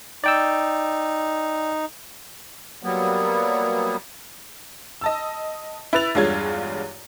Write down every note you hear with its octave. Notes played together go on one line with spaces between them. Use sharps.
D#4 D5 G5 E6
F#3 G3 A#3 B3
D#5 A5 E6
E4 B4 E6 A6 F7
E2 G2 G#3 F4 C#5 G#6